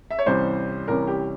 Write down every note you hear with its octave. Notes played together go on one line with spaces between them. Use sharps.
E5
C#5
C2 C3 E3 G3 C#4 C5
C2 C3 E3 G3 C#4 A#4
G4